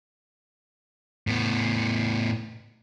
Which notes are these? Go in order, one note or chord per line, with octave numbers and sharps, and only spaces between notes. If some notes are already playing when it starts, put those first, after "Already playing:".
A2 B3